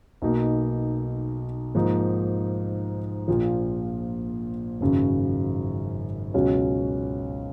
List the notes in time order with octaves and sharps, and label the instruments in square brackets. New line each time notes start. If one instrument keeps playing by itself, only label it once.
[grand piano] B1 B2 A#3 D#4
G#2 F3 A#3 D#4
A#1 A#2 F3
G#1 F#2 C#3 F#3
C#2 B2 F#3 C#4